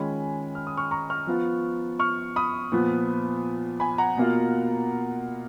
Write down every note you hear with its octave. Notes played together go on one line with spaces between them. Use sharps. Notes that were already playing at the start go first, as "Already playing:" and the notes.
Already playing: D#3 G#3 C#4 F4 G#5 B5
F6
D#6
C#6 F6
A#5 C#6
C#6 F6
F3 B3 F4
C#6 F6
B5 D#6
A#2 F3 B3
G#5 B5
F#5 A#5
B2 A#3 F4